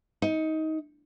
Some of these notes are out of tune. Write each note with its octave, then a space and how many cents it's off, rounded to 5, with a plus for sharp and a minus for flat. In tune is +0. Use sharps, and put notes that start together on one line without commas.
D#4 +20